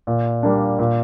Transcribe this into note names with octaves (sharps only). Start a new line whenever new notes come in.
A#2
G3 A#3 D4
A#2